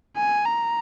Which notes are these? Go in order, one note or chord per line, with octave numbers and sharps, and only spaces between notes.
G#5
A#5